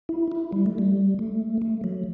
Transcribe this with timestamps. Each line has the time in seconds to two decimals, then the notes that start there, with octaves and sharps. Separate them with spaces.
0.09 E4
0.32 E4
0.52 G3
0.66 A3
0.78 G3
1.19 A3
1.62 A3
1.84 F#3